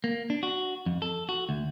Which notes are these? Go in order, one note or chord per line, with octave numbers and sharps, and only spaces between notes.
A#3
D4
F#4
F2
A4
F#4
D2